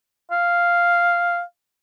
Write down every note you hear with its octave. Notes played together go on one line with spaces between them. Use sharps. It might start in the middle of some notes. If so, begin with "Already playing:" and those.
F5